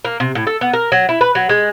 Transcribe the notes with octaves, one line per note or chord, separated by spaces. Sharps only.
A#3
C3
A2
A4
B3
A#4
F#3
E4
B4
F#3
G#3